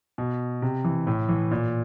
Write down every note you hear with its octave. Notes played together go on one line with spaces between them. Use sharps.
B2
C3
E3
A2
E3
A#2